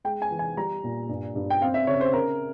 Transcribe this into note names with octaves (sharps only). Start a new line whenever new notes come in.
G#3 G5
G#5
E3
G#5
G3 A#5
A#2
G2
G2
G5
C4 F5
E5
C#3 C#5
C5
C#3 A#4